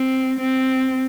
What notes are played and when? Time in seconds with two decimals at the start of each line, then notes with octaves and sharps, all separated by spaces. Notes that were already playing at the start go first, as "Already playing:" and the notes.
Already playing: C4
0.39 C4